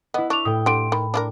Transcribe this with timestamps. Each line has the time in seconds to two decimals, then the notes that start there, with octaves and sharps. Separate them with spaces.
0.14 B3 E4 B4 D#5
0.30 D4 C#6 F7
0.45 A2 G5 D#6
0.66 D3 G3 C6 D7
0.92 D#3 B5
1.14 D4 E4 A#4